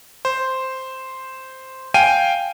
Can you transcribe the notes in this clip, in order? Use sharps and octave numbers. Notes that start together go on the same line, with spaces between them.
C5
F5 G5 G#5 D#7